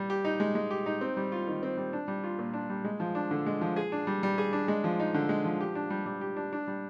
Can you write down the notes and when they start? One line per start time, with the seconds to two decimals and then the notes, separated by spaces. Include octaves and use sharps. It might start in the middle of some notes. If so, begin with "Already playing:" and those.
Already playing: G3
0.10 G4
0.25 D#4
0.40 G#3
0.55 G#3
0.71 G4
0.86 D#4
1.01 C4
1.17 G3
1.32 F4
1.47 D#3
1.63 C4
1.77 G3
1.93 D4
2.08 G3
2.24 F4
2.39 A#2
2.54 D4
2.70 G3
2.84 G#3
3.00 F3
3.15 D4
3.31 D3
3.46 G#3
3.61 F3
3.76 G#4
3.92 D4
4.07 G3
4.23 G3
4.38 G#4
4.53 D4
4.68 G#3
4.84 F3
5.00 D#4
5.14 D3
5.29 G#3
5.44 F3
5.61 G4
5.75 D4
5.90 G3
6.06 G3
6.21 G4
6.36 D4
6.53 D4
6.67 G3